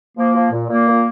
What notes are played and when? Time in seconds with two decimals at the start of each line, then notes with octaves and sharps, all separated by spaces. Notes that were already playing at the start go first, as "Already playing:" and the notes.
0.17 F3 A#3
0.34 F3
0.52 A#2
0.69 A#2 A#3
0.87 A#2